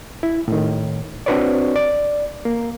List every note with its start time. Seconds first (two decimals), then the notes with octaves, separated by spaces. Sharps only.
0.23 E4
0.48 A2 D#3
1.26 C4 D4 F#4 B4 C#5 D5
1.76 D5
2.45 A#3